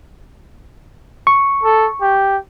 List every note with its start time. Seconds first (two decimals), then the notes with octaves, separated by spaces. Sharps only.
1.27 C#6
1.63 A4
2.01 G4